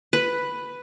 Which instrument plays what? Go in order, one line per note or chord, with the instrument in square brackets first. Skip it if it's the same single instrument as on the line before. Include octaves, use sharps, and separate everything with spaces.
[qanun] B4